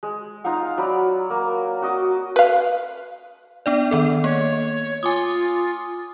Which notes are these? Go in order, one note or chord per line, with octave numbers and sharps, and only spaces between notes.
G#3
D#4 F4 F5 F#5
F#3 D5 B5
A#3
F#4 D#5 D6
B4 F5
B3 D4 D5
D#3 B3 A4
A#3 C#5
F4 G#5 D6 D#6